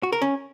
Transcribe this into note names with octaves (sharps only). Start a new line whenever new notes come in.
F#4
A#4
C#4